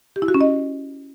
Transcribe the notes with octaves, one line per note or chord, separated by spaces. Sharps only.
G4
E4
F#4
C#4
D#5